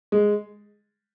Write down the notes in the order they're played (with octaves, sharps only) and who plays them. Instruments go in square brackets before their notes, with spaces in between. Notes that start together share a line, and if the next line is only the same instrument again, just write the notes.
[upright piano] G#3